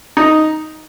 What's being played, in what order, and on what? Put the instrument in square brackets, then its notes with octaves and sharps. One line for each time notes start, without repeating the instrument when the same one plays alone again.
[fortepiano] D#4